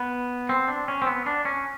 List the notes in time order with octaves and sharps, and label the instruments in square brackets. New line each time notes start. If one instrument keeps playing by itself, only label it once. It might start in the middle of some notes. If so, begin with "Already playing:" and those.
Already playing: [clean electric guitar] B3
C4
D4
C#4
C4
B3
D4
C#4